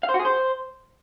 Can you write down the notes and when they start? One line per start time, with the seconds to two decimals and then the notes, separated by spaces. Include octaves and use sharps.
0.03 F5
0.09 C5
0.14 F#4
0.19 G#4
0.25 C5